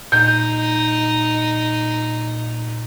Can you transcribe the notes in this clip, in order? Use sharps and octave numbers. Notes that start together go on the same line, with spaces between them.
A#2 D#4 G6